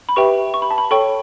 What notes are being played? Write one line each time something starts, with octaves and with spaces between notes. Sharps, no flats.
B5
G4 B4 E5 G5 C#6
C#6
B5
A5
B5
A4 C#5 G5 C#6